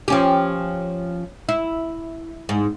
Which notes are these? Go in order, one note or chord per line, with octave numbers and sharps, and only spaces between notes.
F3 C#4 G4
E4
G#2